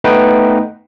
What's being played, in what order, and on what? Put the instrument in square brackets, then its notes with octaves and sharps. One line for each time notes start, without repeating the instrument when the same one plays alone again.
[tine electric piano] A3 B3 D#4 B4 G5